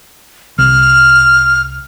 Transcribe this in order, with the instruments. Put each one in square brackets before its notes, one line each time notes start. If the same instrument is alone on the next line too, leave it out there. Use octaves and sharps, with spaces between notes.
[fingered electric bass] C2 [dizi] F6